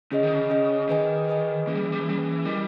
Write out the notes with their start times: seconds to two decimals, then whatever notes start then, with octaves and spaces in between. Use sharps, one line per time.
0.11 C#3 C#4 G#4 D#5
0.23 D#3
0.34 C#3
0.50 C#4 G#4 D#5
0.89 D#3 G#4 B4 D#5 G#5
1.28 G#4 B4 D#5 G#5
1.67 E3 A#3 C#4 G#4
1.75 G3
1.84 E3
1.92 G3
2.01 E3
2.06 G3 A#3 C#4 G#4
2.17 E3
2.45 G3 E4 A#4 D#5 G#5